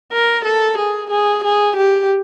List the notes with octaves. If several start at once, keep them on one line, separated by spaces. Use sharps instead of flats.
A#4
A4
G#4
G#4
G#4
G4